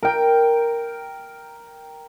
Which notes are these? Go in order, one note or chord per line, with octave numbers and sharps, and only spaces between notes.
A#4 G5